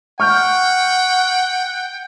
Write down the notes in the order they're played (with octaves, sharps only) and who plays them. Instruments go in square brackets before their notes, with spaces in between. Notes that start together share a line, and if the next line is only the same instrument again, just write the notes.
[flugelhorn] F#5 [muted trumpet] G5 [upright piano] C#6 F6 G6